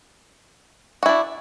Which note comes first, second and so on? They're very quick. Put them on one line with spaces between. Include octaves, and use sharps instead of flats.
F#4 E4 D4